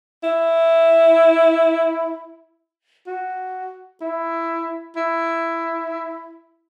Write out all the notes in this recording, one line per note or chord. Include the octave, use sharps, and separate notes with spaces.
E4
F#4
E4
E4